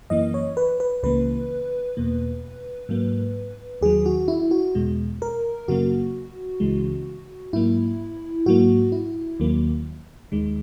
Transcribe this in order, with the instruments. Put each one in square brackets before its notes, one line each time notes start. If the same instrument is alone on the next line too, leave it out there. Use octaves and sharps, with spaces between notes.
[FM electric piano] F#2 E3 A#3 D#5
C#5
B4
B4
C#2 C#3 E3 A#3 B4
E2 B2 A#3
G#2 F#3 A#3
D#2 D#3 F#3 G#4
F#4
E4
F#4
E2 B2 G#3
A#4
F#2 C#3 F#3 A#3 F#4
C#2 C#3 E3 G#3
G#2 F#3 A#3 E4
G#2 F#3 A#3 F#4
E4
D#2 D#3 F#3 A#3
D#2 D#3 G#3